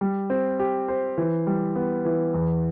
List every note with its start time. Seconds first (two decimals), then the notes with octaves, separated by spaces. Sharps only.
0.01 G3
0.30 C4
0.60 G4
0.88 C5
1.18 E3
1.47 G3
1.76 B3
2.05 E3
2.34 E2